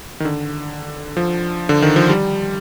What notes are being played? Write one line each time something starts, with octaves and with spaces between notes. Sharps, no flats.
D#3
D3
F3
D3
D#3
F3
G3